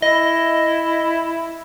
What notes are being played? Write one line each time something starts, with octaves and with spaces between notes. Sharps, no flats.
E4 D#5